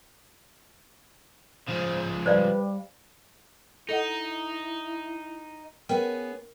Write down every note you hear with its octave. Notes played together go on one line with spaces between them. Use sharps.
C#3 F3 C5
G3 B4 C5 D5 F5
D#4 E4 A4 D#5 F#5
B3 C#4 G#4 A#4 G5